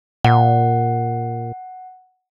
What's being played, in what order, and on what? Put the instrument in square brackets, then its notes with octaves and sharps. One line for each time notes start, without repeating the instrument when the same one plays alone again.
[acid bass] A#2 [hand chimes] F#5